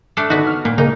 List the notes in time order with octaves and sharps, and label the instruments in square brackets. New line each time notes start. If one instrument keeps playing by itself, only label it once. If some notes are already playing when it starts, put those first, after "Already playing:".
[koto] A3 D4 A4
[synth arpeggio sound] D3 D#4 [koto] B3 F#4
[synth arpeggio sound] F6
[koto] A#2 [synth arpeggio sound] A#3
[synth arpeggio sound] C#3 G#3 A#3 [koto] D#4